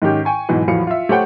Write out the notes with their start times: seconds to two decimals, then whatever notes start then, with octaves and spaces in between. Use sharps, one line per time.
0.02 G#2 D#3 C#4 G4
0.25 G5 G#5 C#6
0.49 G#2 B2 E3 F#3
0.68 E2 A2 F3 F#3 F5 C#7
0.87 F4 E5
1.09 A3 G4 C5 C#5 F#5 G5